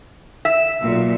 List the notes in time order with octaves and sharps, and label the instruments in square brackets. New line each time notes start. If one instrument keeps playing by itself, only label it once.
[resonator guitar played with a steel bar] E5
[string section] B1 A#2